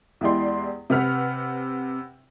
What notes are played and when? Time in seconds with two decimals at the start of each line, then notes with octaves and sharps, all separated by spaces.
0.21 E2 G#3 E4 G4 D5 C6
0.90 C3 B4 F#5 F6 B6